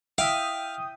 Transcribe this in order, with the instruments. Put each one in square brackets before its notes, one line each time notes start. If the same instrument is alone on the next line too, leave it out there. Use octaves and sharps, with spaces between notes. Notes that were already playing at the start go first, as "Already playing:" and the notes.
[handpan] E5 [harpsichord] F5 [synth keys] G5 D#6